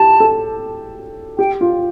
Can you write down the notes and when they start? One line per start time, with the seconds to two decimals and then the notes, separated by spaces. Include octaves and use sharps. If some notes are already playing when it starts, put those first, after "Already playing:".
Already playing: E4 G4 A5
0.20 A4
1.38 G4 G5
1.61 F4